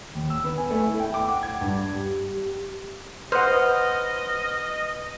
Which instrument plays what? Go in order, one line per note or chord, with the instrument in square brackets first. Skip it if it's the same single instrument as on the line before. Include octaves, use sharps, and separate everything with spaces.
[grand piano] D#2
E6
B3
G#5
A3
E4
G5
D6
F#5
G#6
G2
[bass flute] G4
[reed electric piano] B4 [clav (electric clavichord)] C5 F#5 [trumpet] D#5 [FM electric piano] D#6 F6